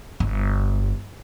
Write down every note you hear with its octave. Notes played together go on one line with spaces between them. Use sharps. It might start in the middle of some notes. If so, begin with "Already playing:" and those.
G1